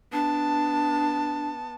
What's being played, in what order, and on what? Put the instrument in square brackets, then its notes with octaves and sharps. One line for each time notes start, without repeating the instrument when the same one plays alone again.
[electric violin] B3 A5 [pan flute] D4